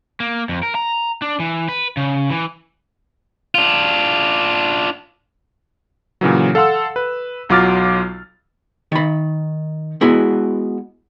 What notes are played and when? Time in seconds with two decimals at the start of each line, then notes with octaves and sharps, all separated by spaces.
0.20 A#3
0.49 F2
0.63 A#4
0.75 A#5
1.22 D4
1.40 E3
1.69 B4
1.97 C#3
2.30 E3
3.55 D4 F4
6.21 A#2 C#3 E3 F#3
6.55 A4 F5 F#5 C6 E6
6.96 B4
7.49 B1 F#3 F4 D6 F6 A6
8.92 D#3 B5
10.01 G#3 B3 E4 F#4